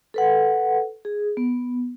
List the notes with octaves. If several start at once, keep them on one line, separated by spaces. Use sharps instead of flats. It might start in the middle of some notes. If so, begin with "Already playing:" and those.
A4 B4 F#5
G#4
B3